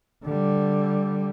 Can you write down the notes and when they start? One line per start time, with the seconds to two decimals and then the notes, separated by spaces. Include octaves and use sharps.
0.24 D3 G3